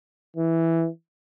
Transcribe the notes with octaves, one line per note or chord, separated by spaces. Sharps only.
E3